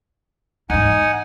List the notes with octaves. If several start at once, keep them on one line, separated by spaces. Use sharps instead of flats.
E2 G#2 D#4 F#5 G#5